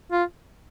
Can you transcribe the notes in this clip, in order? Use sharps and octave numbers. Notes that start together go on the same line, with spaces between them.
F4